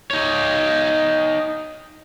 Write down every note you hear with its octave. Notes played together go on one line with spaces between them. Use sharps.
D#4 C#5